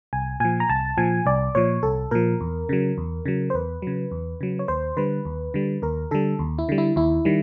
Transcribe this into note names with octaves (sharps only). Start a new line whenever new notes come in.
C2 G#5
A#2 F3 G#5
A#5
C2 A5
A#2 F3 G#5
C2 D5
A#2 F3 C#5
C2 A4
A#2 F3 A#4
E2
C#3 F#3
E2
C#3 F#3
C5
E2 B4
C#3 F#3
E2
C#3 F#3
C#5
D#2 C5
D3 G3 B4
D#2
D3 G3
D#2 A#4
D3 G3 A4
D#2
E4
D3 G3
E4
D#2 E4
D#3 G3